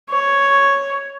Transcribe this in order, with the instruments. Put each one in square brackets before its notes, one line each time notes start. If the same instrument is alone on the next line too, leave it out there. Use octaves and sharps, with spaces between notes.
[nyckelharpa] C#5